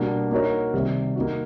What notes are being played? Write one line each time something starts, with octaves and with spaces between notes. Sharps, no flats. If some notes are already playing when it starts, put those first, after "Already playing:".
Already playing: B2 G3 A#3 D4
A#3 D#4 F#4 A#4 C#5
C3 D#3 G3
A#3 D#4 F#4